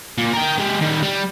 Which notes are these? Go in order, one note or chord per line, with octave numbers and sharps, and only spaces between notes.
A#2
A#4 G5
G#3 G4
D#3 G3
G3